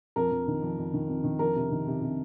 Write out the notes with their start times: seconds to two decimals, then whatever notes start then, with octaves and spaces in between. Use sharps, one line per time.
0.16 F2 A#4
0.31 F2
0.47 D#3
0.63 F2
0.78 F2
0.93 D#3
1.09 F2
1.24 D#3
1.39 F2 A#4
1.56 C3
1.71 D#3
1.87 C3
2.02 C3